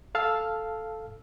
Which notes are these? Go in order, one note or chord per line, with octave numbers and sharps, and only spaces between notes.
A4 F5 A5 E6 F6